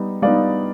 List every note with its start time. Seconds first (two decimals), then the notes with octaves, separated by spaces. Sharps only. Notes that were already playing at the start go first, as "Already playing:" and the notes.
Already playing: G3 B3 D#4
0.22 G3 B3 D#4 D5 F5